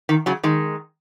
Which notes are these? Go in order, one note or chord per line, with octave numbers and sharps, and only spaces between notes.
D#3
C#3 F#3
D#3 G#3